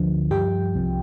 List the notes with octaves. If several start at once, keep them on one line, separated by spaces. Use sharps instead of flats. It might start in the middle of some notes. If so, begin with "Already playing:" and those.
Already playing: D2 D3 F3
G2 F3 G4 G5
C2 C3 F3